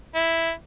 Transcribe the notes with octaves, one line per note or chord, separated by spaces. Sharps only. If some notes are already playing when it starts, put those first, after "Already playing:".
E4